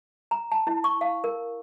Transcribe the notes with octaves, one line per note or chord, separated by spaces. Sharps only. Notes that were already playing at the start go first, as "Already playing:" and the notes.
A#5
A5
E4
C#6
F5
A#4